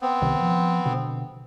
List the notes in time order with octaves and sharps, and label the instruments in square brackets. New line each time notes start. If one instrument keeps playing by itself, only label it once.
[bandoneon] B3 C4
[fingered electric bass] C2 C3 D#3
F3
B2 D3